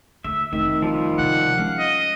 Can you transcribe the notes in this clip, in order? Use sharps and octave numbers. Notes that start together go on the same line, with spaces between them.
D2 E5
F1 D#3 E5
F3 G3 F4
D#1 C3 F#5
G#3 C#4 F5
D#5